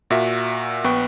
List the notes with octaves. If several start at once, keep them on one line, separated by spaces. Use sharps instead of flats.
A#2 F#4 A#4 E5
A#1 B3 B4 G5 C#6